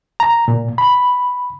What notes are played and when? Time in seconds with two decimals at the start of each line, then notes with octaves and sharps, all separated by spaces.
0.20 A#5
0.48 A#2
0.78 B5